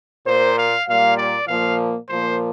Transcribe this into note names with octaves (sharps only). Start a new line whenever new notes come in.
A#2 A#3 C5
F5
A#2 G3 A#3 F5
D5
A#2 F3 A#3 F5
A#2 F3 A#3 C5